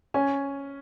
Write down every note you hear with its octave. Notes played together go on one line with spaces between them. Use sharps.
C#4 G#5